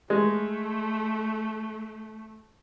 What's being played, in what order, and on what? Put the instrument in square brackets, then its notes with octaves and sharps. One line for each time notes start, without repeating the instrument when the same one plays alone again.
[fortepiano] G#3 [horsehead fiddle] A3